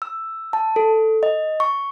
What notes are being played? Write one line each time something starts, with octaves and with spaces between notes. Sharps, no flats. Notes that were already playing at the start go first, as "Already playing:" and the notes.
E6
A5
A4
D#5
C#6